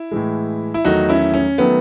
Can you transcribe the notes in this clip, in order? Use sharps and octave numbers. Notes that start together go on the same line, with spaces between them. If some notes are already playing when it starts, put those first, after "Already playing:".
Already playing: E4
A2 E3 G#3
E4
E2 D#3 F#3 A3 D#4 F#4
C#4 E4
C#4
D#3 F#3 A3 B3